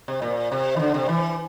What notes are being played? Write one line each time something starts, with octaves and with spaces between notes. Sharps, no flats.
C3
A#2
C3
E3
D3
C3
E3